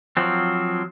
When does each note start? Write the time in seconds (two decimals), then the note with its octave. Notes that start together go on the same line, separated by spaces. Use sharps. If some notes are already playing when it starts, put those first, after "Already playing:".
0.17 F3 F#3 C4